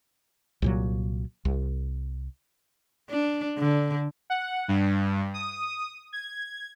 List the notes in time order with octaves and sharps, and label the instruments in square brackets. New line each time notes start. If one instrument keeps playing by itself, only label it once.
[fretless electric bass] C2 A#2 F#3
C2
[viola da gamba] D4
D3
[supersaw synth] F#5
G2
D#6
G#6